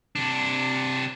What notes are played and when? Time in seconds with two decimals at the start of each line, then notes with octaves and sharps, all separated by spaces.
0.16 C3 D4